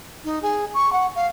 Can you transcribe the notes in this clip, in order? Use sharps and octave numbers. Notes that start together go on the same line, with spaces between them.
D#4
G#4
C#6
F#5
F5